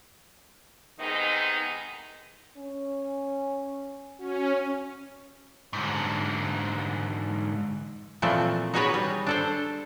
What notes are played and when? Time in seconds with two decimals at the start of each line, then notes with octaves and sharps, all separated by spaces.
1.00 C3 D#3 G#3 B3 D#4
2.58 C#4
4.20 C#4 F#4
5.73 G#2 D3
8.22 A#2 E3 F3 A3 C4
8.74 D#4 F#4 G#4 B4 C#5 D5
8.94 G3
9.27 D4 A4 C5